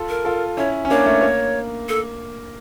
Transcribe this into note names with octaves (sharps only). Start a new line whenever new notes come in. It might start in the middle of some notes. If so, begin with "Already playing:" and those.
Already playing: F4 A4
A#4
F4 A4
C#4 E4 C#5
C#4
A#3 D4 C#5
A3 C#4
A#3
A4